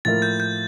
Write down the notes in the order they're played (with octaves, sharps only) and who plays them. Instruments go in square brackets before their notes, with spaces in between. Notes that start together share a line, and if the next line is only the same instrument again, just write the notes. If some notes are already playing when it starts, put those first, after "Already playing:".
[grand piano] A2 F3 A#3 E4 A#4 [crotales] A6
[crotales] G6
G6